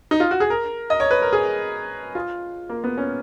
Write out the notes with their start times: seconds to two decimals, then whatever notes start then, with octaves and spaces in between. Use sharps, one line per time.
0.11 D#4
0.20 F4
0.31 F#4
0.40 G#4
0.50 A#4
0.90 D#5
1.00 C#5
1.11 B4
1.22 A#4
1.33 G#4
2.15 F4
2.69 A#3
2.84 B3
2.98 C#4